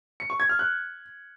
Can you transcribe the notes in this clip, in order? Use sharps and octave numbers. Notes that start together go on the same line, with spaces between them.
C#7
C#6
G#6
F6
F#6